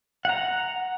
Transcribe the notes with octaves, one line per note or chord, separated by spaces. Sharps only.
F#5 A#5